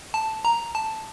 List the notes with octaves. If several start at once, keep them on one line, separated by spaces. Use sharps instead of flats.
A5
A#5
A5